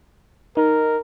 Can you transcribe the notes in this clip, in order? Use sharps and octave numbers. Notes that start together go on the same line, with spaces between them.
D#4 A#4